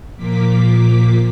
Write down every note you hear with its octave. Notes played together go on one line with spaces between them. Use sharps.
A#2 F3 A#3 D6 B6